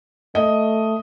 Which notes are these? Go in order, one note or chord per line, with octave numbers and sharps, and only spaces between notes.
A3 D#5